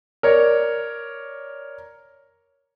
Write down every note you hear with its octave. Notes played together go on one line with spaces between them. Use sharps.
A#4 C#5 D5